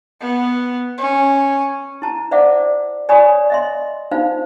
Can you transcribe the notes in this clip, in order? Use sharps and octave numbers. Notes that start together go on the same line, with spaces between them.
B3
C#4
E4 A5 A#5
C5 D5 E5 F#5 D6
C#5 D5 G#5 B5 C#6 D#6
D#5 E5 C6
D#4 F4 C5 F5